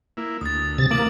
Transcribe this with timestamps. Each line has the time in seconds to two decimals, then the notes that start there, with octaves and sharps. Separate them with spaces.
0.17 A#3 E4
0.41 D2 D#6 A6
0.78 C3 A6
0.91 E3 A#3 D6 D7 F#7